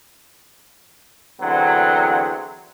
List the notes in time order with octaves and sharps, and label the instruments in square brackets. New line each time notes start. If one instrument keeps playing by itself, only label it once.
[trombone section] E2 D3 F#3 C4